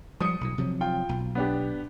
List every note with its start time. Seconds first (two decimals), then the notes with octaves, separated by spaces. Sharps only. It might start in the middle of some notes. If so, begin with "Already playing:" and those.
0.21 F3 G3 D#6 C#7
0.41 B1 A#2
0.58 C3 F3 F#3
0.81 F4 G5
1.09 B1
1.35 B3 D4 G4